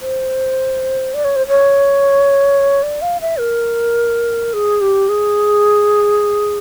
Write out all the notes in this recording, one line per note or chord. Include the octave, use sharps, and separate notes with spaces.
C5
D5
C#5
C5
C#5
D5
F5
E5
A#4
G#4
G4
G#4